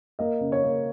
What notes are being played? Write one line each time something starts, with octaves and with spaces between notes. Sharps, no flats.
A#3 D#5
C#3
C#5
A#3